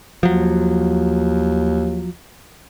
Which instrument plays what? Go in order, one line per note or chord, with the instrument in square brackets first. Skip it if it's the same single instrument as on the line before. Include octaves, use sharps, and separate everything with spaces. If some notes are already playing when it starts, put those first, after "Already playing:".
[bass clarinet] D#2 [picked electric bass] F3 F#3